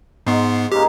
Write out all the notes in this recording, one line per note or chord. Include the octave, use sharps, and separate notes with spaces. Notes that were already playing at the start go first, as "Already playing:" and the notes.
G#2 G#3 B3 C6 C#6
G#2 C#3 A#3 G4